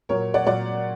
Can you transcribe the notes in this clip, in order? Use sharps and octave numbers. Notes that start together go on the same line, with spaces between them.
A#2 F#3 A#4 C#5
D5 F#5
A#2 F#3 D5 F#5